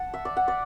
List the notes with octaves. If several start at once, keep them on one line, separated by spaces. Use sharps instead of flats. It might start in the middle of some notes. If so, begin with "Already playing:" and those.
Already playing: F#5 A5
E5
D5
F#5
D5